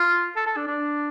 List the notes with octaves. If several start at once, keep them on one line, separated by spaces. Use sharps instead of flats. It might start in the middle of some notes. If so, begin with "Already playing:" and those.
Already playing: F4
A4
A4
D4
D4